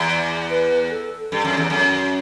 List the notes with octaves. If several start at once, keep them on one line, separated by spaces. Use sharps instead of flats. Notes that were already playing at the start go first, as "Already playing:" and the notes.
Already playing: E2
D5
B4
A4
G2 A4
F#2
E2
F#2